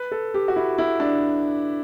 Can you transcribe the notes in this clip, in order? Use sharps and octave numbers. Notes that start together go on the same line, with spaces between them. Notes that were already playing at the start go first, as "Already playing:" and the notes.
Already playing: B4
A4
G4
F#4
E4
E4
D4